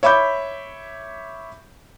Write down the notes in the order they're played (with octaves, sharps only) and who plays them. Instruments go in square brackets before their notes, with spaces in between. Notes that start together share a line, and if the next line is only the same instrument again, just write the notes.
[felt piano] C#5 E5 B5 D6 G6